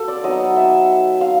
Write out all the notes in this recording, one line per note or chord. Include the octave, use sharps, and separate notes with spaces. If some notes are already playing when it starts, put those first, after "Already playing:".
Already playing: A#3 F#4 A4
D5
F#3 B3 D#4 D#5
E5
F5